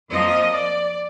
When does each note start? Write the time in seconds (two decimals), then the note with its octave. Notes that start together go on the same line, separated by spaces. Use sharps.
0.11 F2 F3 A#3 D#5
0.54 D5